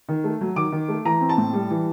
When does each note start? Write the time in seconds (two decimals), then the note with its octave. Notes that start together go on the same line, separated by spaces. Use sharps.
0.09 D#3
0.24 A3
0.41 F#3
0.56 D#3 D6
0.72 D#3
0.88 A3
1.05 E3 A#5
1.21 C4
1.29 A5
1.38 A2
1.53 G3
1.70 E3